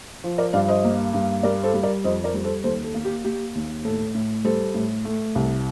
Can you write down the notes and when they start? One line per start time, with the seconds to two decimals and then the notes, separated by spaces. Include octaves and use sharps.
0.24 F3
0.38 A#4 D5
0.53 G2 D5 F5
0.68 C5 D#5
0.84 A#3
1.13 G2
1.43 G3 A#4 D5
1.63 A4 C5
1.74 G3
1.83 A#4 D5
2.04 F2 C5 D#5
2.24 A#4 D5
2.34 G3
2.44 A4 C5
2.64 D#2 A4 C5
2.84 A4
2.94 A#3
3.05 G4
3.25 A#3 G4
3.55 D#2
3.85 A2 A4
4.15 A2
4.44 G3 A4 C5
4.74 A2
5.05 A3
5.35 C2